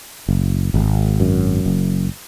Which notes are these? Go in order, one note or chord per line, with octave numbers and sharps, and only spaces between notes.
F#1
G#1
F#2
F#1